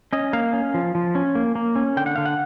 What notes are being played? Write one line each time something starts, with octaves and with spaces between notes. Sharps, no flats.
C#4 D#5
A#3 F5
C#4
F3
F3
C#4
A#3
A#3
C#4
D3 G5
F#5
D3 F5
F#5